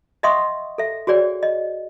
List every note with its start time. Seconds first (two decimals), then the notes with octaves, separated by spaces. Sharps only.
0.23 D#5 E5 F#5 C6 C#6 D#6
0.78 A4 E5
1.07 F#4 G#4 C#5 D5 G5
1.43 D#5